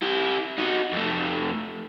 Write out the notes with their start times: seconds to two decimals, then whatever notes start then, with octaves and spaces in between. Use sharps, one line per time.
0.02 E4 G4
0.58 D#4 F#4
0.93 F2 A3